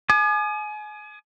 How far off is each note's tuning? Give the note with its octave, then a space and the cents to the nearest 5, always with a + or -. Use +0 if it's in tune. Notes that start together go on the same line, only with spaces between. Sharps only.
G#5 +30 D#6 -45